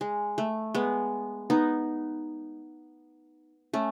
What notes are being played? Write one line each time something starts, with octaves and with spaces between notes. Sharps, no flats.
G#3
A3
G#3 B3
B3 D#4
A3 C#4